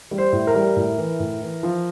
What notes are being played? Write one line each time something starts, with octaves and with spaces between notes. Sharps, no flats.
G3
C5
A2
A#4
G3
A2
E3
A2
E3
F3